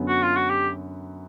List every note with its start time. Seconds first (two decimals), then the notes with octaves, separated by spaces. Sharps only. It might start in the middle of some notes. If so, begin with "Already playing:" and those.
Already playing: F#2 D3 F#3 B3
0.08 F#4
0.23 F4
0.36 F#4
0.50 G4